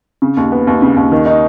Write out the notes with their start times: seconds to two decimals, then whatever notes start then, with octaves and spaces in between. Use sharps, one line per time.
0.22 C#3
0.37 D#2
0.52 B3
0.67 D#2
0.82 C#3
0.96 D#2
1.12 D#3
1.26 D#4